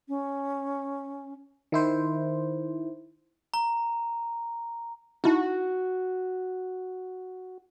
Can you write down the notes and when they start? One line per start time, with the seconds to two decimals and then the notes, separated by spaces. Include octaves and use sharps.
0.08 C#4
1.72 D#3 E4 C5
3.54 A#5
5.24 D#4 E4 F#4 A5